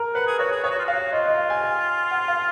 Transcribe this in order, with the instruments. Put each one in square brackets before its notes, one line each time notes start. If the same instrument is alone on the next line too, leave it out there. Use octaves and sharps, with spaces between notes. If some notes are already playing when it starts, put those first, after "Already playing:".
Already playing: [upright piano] A#4
[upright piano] B4 [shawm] F#5
[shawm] G#4
[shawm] F#4 [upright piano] C#5
[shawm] G#4
[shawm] G#4 [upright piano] C#5
[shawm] F#4
F4
[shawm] F#4 [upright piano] F5
[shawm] F4 [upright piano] D#5
[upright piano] D#5
F5
G#5
G#5
F#5
F5